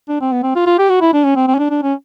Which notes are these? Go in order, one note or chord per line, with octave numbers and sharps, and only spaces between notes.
D4
C4
B3
C4
F4
F4
G4
F#4
E4
D4
C#4
C4
C4
C#4
D4
D4
C#4